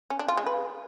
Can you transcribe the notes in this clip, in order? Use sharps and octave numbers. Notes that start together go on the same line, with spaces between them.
C#4
D4
F4
G#3
B4